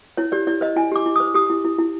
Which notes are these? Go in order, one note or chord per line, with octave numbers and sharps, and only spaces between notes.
E4 C#5
G4 D5
E4 D5
C5 D#5
E4 G#5
G4 D6
E4
C5 D#6
G4 D#6
E4
E4
E4